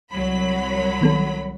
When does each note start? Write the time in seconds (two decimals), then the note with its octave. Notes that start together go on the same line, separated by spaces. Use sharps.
0.11 C2 F#3 B5
1.01 D#3 B3 A4